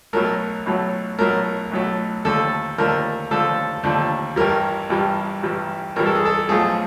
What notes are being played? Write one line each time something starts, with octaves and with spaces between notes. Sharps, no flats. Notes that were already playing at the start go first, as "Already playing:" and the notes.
B1 A2 F#3 A3 A#4
B1 A2 F#3 A3
B1 A2 F#3 A3 A#4
B1 A2 F#3 A3
D#2 D3 F3 A3 D4 A4
D#2 D3 F3 A3 D4 A#4
D#2 D3 F3 A3 D4 A4
D#2 D3 F3 A3 D4
A1 G2 E3 G3 A#4
A1 G2 E3 G3
A1 G2 E3 G3
A1 G2 E3 G3 A#4
A4
G#4
A4
B1 A2 F3 A3 G#4